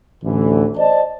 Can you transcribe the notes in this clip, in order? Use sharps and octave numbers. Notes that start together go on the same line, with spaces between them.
A1 D2 E3
C5 D5 D#5 A5